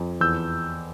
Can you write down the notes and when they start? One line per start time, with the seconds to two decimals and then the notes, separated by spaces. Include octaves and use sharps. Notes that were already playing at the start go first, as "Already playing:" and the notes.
Already playing: F2
0.21 E2 E6 G6